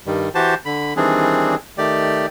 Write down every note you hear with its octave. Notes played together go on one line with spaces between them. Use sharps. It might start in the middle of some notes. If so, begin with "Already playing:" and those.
G2 D#3 G3
E3 F#4 G4 C5 A5
D3 B5
D#3 E3 G3 C4 D4 G#4
D#3 A3 G4 D5